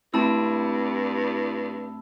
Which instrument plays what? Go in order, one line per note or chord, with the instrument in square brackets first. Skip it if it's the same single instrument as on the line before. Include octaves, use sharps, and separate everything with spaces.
[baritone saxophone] G2 [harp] A3 C4 [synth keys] E4 [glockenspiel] A5 B5 E6